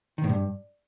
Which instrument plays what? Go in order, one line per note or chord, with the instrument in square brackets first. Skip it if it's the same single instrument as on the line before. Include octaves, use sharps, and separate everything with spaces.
[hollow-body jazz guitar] D#3
A2
G2